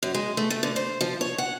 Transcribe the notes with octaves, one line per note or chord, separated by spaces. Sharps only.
F#2
G#3
A3
A3
D3
C5
F3
C#5
F#5